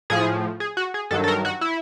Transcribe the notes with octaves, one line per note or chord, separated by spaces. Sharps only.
A2 F3 G#4
G#4
F#4
G#4
G2 D#3 F#3 A4
A4
A#4
F#4
E4